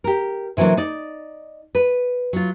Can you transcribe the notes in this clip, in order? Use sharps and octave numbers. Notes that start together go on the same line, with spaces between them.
G4 A#4
C3 E3 F#3 A#3 D4
D#4 D5
B4
F#3 F4